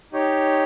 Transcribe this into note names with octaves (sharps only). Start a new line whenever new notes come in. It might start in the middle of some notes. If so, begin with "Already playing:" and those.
D#4 G4 C#5